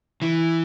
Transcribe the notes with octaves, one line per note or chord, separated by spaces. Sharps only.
E3